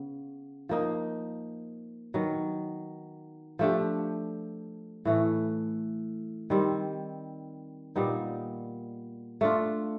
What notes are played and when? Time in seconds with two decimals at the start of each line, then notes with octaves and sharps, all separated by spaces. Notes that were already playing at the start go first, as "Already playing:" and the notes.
Already playing: C#3 B3
0.69 F3 A#3 D#4
2.14 D#3 F#3 B3
3.59 F3 A3 D4 G4
5.05 A2 E3 A3
6.50 D#3 G3 C4
7.96 A#2 G3 B3 D#4
9.41 A3 D4 F4